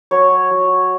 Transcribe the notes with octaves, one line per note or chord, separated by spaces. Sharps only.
F#3 C#5
F#3